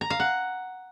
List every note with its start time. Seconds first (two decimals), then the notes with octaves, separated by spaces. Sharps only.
0.01 A#5
0.10 F5
0.20 F#5